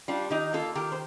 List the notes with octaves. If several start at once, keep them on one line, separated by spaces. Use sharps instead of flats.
G3 D4 F4
D#3 D#4 G4
A#3 F4 A4
D#3 G4 A#4
C5